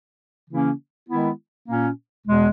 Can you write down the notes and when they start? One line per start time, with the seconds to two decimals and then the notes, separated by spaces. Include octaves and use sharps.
0.49 C#3 E3 A#3 C#4 E4
1.09 D#3 G#3 B3 E4
1.68 A#2 A#3 C#4
2.26 E2 B2 G#3